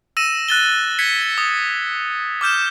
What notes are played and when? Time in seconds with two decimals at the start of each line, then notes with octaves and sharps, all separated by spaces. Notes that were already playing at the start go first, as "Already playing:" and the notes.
0.17 E6 A#6 D#7 E7
0.48 F#6 A6 G7
0.99 G#6 B6 C#7
1.38 D#6
2.41 D6 F6 G6 E7